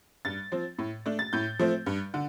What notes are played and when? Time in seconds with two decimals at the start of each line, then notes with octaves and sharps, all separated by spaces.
0.25 G2 A6
0.52 F3 C4
0.79 A2
1.06 A3 D4
1.19 A6
1.33 A2 G6
1.59 F3 A3 C4
1.86 G2
2.14 D3